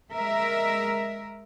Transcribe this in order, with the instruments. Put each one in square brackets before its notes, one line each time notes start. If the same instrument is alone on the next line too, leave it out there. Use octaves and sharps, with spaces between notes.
[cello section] G#3 A#4 E5